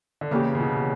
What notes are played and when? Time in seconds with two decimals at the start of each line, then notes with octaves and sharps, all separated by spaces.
0.21 D3
0.31 C#3 E3 A#3 C#4 G4
0.55 C#3
0.60 B2